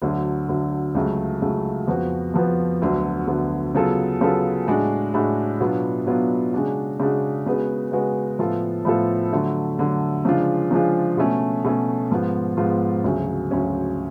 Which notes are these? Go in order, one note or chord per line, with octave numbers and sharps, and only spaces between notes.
D2 D3 F#3
D2 D3 F#3
C#2 C#3 F#3 A3
C#2 C#3 F#3 A3
F2 F3 B3 F#4 B4
F2 F3 B3 F#4 B4
D2 D3 F#3 B3
D2 D3 F#3 B3
C#3 F#3 B3 F4 A4
C#3 F#3 B3 F4 A4
A2 G#3 D4 F#4
A2 G#3 D4 F#4
B2 F#3 B3 D4 F4
B2 F#3 B3 D4 F4
C#3 G#3 D4 F#4
C#3 G#3 D4 F#4
C#3 G#3 B3 F#4 B4
C#3 G#3 B3 F#4 B4
A2 F3 B3 F4 A4
A2 F3 B3 F4 A4
D3 F#3 A3
D3 F#3 A3
C#3 F3 G#3 D4 F4
C#3 F3 G#3 D4 F4
B2 A3 C#4
B2 A3 C#4
G#2 F3 B3 F4
G#2 F3 B3 F4
D2 C#3 F#3 C#4
D2 C#3 F#3 C#4